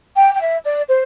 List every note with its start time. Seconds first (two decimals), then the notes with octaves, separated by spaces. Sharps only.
0.16 G5
0.34 G5
0.40 E5
0.64 D5
0.88 C5